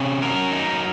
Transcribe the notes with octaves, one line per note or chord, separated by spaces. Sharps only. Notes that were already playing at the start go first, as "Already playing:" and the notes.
Already playing: C3 C#4
F#3 A#4
D#4